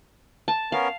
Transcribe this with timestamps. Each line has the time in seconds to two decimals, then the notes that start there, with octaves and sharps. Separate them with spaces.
0.48 A5
0.72 B3 C#4 A#4 F5